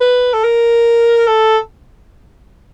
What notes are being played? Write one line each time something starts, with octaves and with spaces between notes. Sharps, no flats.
B4
A4
A#4
A4